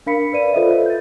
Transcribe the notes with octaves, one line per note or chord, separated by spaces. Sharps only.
D4 A#4 F5 B5 B6 C#7
A#4 B4 D5 D#7
F4 A4 B4 C5 D#5 E5
C5 E5
G6 A6